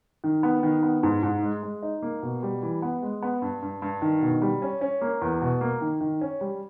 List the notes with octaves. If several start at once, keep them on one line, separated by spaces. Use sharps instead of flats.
D#3
B3
D#3
B3
G#2
G#2
G#3
G#3
D#4
A#3
B2
G3
E3
B3
G#3
B3
G2
G2
G2
D#3
B2
G3
C#4
C#4
A#3
E2
B2
A#3
D#3
D#3
C#4
G3